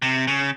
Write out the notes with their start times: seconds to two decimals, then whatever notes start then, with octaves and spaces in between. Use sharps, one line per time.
0.02 C3
0.27 C#3